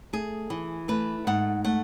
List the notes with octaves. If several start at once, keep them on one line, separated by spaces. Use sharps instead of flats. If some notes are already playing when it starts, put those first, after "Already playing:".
A3 G#4
E3
A3 B4
G#2 F#5
A3 F#5